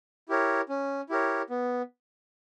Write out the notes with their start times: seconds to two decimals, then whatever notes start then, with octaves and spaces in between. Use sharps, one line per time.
0.29 E4 G4 A#4 C#5
0.69 C#4
1.09 E4 G4 A#4 C#5
1.50 B3